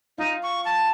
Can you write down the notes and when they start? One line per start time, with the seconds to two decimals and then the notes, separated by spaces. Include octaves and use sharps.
0.18 D#4 F4
0.43 C#6
0.65 A5